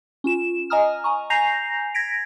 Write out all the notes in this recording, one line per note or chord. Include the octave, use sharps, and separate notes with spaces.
C#4 F4 E7
D#5 G#5 A#5 D#6 F6
G#5 A#5 C#6
G#5 A#5 G6 A#6 C7 F7
G#6 A#6 B6 D7